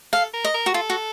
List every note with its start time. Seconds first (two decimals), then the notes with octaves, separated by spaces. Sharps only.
0.13 A4 F5
0.34 A#4
0.45 D#5
0.54 A#4
0.66 F#4
0.74 F4 A4
0.90 F#4